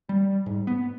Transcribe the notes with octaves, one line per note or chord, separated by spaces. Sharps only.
G3
G#2
B3